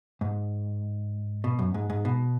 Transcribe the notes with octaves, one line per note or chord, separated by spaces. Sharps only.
G#2
B2
F#2
G#2
G#2
B2